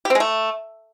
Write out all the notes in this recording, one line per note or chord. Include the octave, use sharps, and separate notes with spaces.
G4
C4
G#3
A3